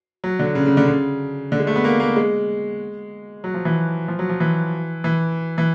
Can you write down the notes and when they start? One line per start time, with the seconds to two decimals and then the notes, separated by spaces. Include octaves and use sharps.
0.24 F#3
0.39 D3
0.55 C#3
0.66 C#3
0.77 D3
0.87 C#3
1.52 D3
1.60 G#3
1.67 A3
1.76 B3
1.84 A#3
2.00 A#3
2.16 G#3
3.44 F#3
3.54 F3
3.65 E3
4.08 F3
4.19 F#3
4.29 F3
4.40 E3
5.04 E3
5.58 E3